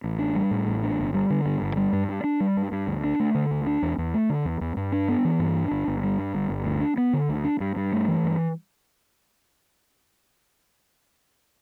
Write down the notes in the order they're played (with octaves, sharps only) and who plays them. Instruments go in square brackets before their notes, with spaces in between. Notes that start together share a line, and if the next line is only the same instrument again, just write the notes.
[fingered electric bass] A1
D4
G3
A2
A1
D4
G1
G3
D3
G2
G1
G3
G2
G2
D4
G3
G2
G2
D2
D4
A3
D3
D2
D4
E2
E2
A3
D3
E2
E2
G2
D4
B3
E3
G2
D4
G1
G1
G3
G2
G1
G1
D2
D4
B3
D3
D2
D4
G2
G2
A3
E3
G2